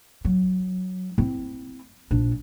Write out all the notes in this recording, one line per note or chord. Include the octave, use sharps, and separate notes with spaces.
F#3
C4 E4
A#1 D4